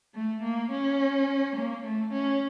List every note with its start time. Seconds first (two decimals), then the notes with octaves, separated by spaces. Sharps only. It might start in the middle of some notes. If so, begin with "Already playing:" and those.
0.15 A3
0.43 A#3
0.72 C#4
1.56 A#3
1.84 A3
2.13 C#4